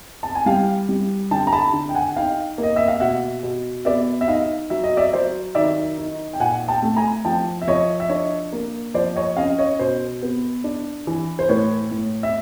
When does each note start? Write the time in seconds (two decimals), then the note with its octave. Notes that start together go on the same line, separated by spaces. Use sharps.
0.23 A5
0.35 G#5
0.46 G3 F5 G5
0.89 G3
1.31 D3 G5 A5
1.47 A#5
1.52 A5 B5
1.73 D3
1.89 G5
1.95 F#5 G#5
2.16 D#4 F5 G5
2.58 A#3 D#5
2.76 E5
2.88 F5
3.00 B2 E5 F#5
3.43 B2
3.85 B3 D5 E5
4.21 E5
4.28 D#4 D#5 F5
4.70 F#3 E5
4.84 D#5
4.97 D5 E5
5.13 F#3 C5 D5
5.55 D#3 D5 E5
5.98 D#4
6.33 G5
6.40 A#2 F#5 G#5
6.68 G5 A5
6.82 A3
6.96 G#5 A#5
7.25 F3 G5 A5
7.62 E5
7.68 F3 C#5 D#5
8.00 E5
8.09 D4 C#5 D#5
8.53 A#3
8.94 F3 C5 D5
9.16 C#5 D#5
9.37 C#4 D#5 F5
9.58 C#5 D#5
9.79 B2 C5
10.23 B3
10.64 D4
11.07 E3
11.39 C5
11.49 A2 B4 C#5
11.91 A2
12.23 E5